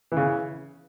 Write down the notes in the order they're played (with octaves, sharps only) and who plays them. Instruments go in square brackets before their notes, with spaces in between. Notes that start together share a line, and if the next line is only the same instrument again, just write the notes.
[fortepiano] C#3 E3